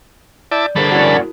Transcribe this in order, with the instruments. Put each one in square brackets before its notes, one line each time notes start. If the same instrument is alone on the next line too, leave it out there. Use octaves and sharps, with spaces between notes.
[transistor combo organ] E4 A5 D6 [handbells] D5 G6
[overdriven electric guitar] G2 A#3 [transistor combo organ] D3 A5 B5 [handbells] D4 G#4 C5
[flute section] C#4 D5 F#5 [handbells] E4 F#4 A#4